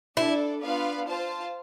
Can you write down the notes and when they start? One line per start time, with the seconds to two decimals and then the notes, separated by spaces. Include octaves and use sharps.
0.17 D4 E4 A4 D5
0.62 B3 D4 F4 B4 F5
1.07 F4 C5 F5 A5